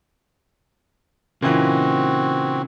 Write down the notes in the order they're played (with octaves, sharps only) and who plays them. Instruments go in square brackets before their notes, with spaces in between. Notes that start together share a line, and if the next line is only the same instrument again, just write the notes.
[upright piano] A#2 E3 [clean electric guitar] C#3 A#3 D#4 [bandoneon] C4 F#4